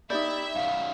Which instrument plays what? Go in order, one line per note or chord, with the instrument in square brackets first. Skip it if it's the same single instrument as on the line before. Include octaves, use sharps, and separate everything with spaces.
[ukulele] D#4 G4 D5 [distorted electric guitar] E4 [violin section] E5 [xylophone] G6
[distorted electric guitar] F#2 D#3 [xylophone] F5